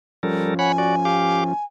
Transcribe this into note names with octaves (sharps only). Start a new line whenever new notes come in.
F3 G3 C#4 A4 A#4
C#5 F#5 G#5 B5
F#4 D5
G4 F5 D6